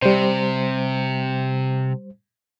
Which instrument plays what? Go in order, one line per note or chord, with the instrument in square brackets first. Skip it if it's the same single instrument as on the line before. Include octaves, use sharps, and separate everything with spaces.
[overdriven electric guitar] C3 [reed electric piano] G3 C5